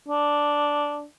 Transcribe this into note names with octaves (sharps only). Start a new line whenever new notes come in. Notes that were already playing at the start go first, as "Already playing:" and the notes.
D4